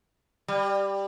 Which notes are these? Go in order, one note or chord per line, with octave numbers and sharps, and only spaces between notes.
G3